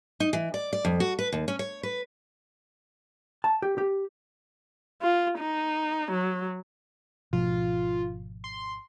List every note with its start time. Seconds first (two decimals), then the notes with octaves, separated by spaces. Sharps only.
0.20 D#4
0.33 E3
0.54 D5
0.73 D5
0.85 F2
1.00 F#4
1.19 B4
1.33 D#2
1.48 C#4
1.59 C#5
1.83 B4
3.44 A5
3.62 G4
3.78 G4
5.02 F4
5.39 D#4
6.12 F#3
7.33 G#1 B2 F3 F4
8.44 C6